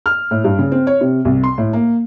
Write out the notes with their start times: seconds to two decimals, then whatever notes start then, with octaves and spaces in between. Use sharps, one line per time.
0.06 F6
0.31 A2
0.44 G2
0.59 C#3
0.72 C4
0.87 C#5
1.01 C3
1.25 C2
1.44 C6
1.58 A2
1.73 A#3